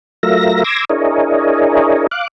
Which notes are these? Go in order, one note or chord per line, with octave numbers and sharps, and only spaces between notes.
F#3 A3 F4 A#4 E5 A#6
C6 D6 E6 G#6 A#6
D4 E4 G#4 A#4 C#5 D#5
F5 D6 F#6